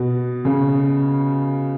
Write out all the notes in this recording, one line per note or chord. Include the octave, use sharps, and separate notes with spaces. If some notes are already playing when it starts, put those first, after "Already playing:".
Already playing: B2
C#3